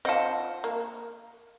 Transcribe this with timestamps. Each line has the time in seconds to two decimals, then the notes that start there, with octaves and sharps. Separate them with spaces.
0.05 C4 F4 D#5 F#5 A5
0.64 A#3